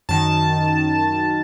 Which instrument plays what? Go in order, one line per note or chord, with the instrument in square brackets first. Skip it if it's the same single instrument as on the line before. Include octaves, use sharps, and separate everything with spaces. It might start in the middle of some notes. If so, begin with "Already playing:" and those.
[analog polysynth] F#2 D#3 A5